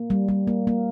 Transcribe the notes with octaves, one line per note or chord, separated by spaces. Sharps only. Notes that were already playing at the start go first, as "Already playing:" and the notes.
Already playing: A#3
G3
G3
A#3
A#3